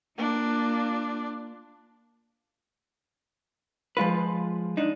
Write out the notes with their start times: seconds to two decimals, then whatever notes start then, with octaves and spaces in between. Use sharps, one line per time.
0.18 A#3 D4 F4
3.97 F3 G#3 F4 B4
4.77 D4 D#4